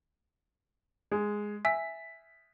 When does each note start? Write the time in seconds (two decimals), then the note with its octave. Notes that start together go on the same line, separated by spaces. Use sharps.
1.11 G#3
1.65 E5 G#5 E6 B6